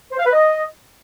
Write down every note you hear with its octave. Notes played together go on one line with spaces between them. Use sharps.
C5
F5
B4
D#5